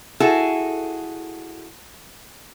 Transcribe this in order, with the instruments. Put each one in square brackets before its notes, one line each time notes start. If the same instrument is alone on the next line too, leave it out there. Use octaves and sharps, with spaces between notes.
[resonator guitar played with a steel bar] E4 F#4 G#4 A4